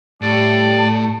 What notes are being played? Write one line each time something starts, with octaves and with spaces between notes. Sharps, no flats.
A2 G3 G4 D5 A5